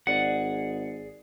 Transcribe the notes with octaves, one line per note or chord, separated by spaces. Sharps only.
G#1 G#4 D5 F#5